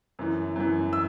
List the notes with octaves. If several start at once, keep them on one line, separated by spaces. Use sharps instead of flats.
F#2 E3
F#2 E3
E6